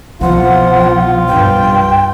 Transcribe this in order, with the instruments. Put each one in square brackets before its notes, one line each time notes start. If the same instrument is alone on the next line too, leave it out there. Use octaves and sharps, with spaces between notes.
[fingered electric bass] C2 B2 E3 [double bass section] F3 [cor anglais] F4 [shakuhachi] F#5
[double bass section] G2 [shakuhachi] G5